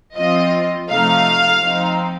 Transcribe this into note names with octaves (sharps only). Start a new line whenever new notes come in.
F3 C4 F4 D#5
C3 F3 A3 D#4 F5
F3 C4 D#4